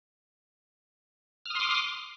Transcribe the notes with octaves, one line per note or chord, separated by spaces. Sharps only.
C6 D6 D#6 F6